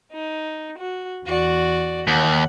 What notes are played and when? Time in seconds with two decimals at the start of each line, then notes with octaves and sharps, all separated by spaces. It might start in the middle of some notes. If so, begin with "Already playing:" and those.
0.13 D#4
0.79 F#4
1.26 E2 F#4 D5
2.07 D#2 F#5